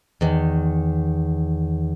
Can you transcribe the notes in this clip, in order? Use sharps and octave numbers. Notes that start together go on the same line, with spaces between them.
E2 D#3